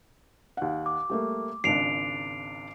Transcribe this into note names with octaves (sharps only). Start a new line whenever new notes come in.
D#2 F#5
D6
G3 A3 A#3
G#1 C#2 D4 C7 D7 F7